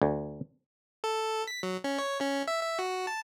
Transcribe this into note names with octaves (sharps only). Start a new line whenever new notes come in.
D2
A4
B6
F#3
C#4
C#5
C#4
E5
E5
F#4
A5